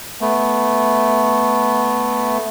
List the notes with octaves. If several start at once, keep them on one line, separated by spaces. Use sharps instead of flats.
A3 B3